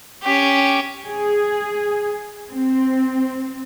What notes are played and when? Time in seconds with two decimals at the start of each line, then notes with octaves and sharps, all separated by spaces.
0.23 C#4 G4
1.06 G#4
2.50 C4